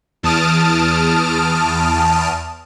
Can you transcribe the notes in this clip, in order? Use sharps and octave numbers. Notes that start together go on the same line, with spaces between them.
E2 A5 D#6 F6 D7